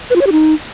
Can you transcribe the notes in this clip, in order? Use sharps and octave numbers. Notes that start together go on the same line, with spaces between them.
B4
F4
C#5
G4
D#4